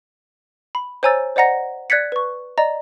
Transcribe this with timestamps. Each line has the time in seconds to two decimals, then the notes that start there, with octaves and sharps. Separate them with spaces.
0.75 B5
1.03 C5 C#5 G#5 A#5 E6 A6
1.36 C5 D5 D#5 F#5 A#5 A#6
1.90 D5 F#6 G#6 A6 B6 C#7
2.12 B4 C#6
2.58 D5 D#5 A#5